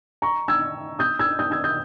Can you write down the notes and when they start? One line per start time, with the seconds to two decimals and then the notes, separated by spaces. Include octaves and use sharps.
0.22 A#5 C#6
0.48 E6 G#6
0.99 D#6 G6
1.19 E6 G#6
1.39 D#6 G6
1.51 E6 G#6
1.64 D#6 G6